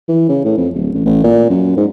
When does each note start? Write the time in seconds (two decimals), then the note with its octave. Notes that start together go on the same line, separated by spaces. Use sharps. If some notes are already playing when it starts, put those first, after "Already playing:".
0.08 E3
0.29 C#3
0.45 A2
0.57 F2
0.74 D1
0.94 A1
1.06 A1
1.23 A#2
1.50 F#2
1.77 G#2